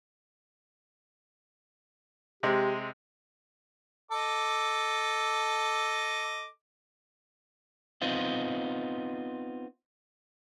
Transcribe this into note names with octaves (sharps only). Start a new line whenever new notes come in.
C3 G#3 G4
A4 D#5 D6
B3 C4 D#4 F4